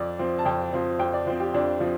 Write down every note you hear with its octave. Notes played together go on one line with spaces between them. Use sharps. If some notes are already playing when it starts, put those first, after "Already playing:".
Already playing: F2 D5
F3 C4
A5
F2 G5
F3 C4
F2 G5
D5
F3 C4 C5
G4
F2 D4
F3 C4